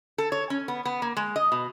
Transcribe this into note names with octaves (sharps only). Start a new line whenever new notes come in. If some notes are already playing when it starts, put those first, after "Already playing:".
A4
C#5
C#4
B3
B3
A#3
G#3
D#5
B2